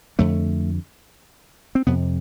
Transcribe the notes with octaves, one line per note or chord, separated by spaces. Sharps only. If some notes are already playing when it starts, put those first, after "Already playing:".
F2 D3 A3
C4
F2 C3 B3